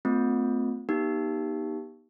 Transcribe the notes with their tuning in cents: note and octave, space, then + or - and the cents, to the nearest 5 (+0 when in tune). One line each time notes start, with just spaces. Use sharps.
A3 +20 C4 -35 F4 +25
B3 -35 D#4 +0 G4 +0